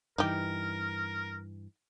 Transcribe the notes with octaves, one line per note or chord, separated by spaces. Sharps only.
G2 E3 D#4 G4 A#4